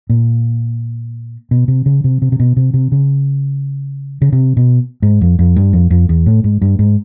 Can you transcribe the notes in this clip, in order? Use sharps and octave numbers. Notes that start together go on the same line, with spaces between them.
A#2
B2
C3
C#3
C3
C3
C3
B2
C3
C3
C#3
C#3
C3
B2
G#2
F2
F2
G2
F2
F2
E2
A2
G#2
G2
G#2